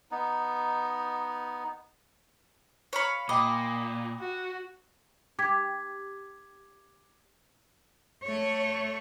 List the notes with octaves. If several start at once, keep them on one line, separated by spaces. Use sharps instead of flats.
B3 D#4
C#5 F5 B5
A#2 D#5 G5 B5 D6
F#4
G4 D6 G#6 B6
A3 C#5